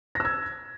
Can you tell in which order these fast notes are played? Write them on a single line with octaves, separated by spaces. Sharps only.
A#6 E6 G#6